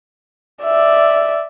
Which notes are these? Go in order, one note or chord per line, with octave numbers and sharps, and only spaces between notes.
D5 E5